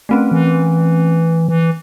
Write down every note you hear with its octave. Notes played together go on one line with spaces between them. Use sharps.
A3 C4 C#4
E3
E3